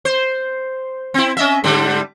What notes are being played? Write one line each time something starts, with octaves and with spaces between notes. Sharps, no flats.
C5
C4 E4
C#4 D#5 E5
G#2 D3 G3